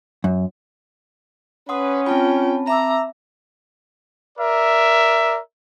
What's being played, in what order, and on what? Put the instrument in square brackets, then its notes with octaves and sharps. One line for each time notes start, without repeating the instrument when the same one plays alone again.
[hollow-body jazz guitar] F#2
[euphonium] C#4 [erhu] B4 [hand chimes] F#5 C6 D#6
[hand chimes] C4 A5 B5 [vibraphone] F4 [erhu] G5
[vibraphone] E5 D6 E6 [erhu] A#5
[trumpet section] A#4 D5 E5